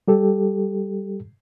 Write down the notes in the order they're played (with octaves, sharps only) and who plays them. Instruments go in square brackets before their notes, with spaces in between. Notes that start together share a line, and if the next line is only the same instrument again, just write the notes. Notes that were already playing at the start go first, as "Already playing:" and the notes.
[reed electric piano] G3 G4 A4